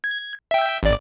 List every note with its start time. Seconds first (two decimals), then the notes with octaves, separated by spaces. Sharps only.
0.04 G#6
0.51 E5 G5
0.83 G#1 D5